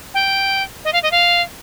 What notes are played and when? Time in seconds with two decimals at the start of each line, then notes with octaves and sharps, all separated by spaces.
0.14 G5
0.84 D#5
0.93 F5
1.02 D#5
1.11 F5